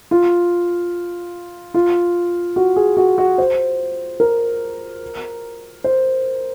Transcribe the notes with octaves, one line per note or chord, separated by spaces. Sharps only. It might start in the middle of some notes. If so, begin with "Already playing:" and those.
F4
F4
F#4
G#4
F#4
F#4
C5
A#4
C5